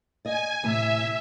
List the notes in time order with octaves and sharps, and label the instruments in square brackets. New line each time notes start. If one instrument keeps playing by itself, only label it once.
[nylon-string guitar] D5 D#5 [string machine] G#5
[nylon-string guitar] A2 C3 E3 [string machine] E5